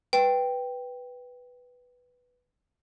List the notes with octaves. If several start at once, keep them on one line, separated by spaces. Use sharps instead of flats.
B4 G5